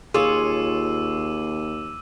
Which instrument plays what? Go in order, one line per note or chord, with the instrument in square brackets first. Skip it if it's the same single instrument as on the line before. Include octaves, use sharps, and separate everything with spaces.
[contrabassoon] D#2 [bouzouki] F4 C#5 [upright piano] G#4 [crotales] D6 E6 D#7